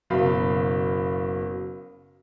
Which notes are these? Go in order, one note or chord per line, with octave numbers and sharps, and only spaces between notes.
F#1 B2 F5 B5